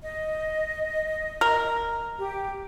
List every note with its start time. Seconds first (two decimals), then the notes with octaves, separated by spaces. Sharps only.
0.01 D#5
1.41 A#4
2.19 G4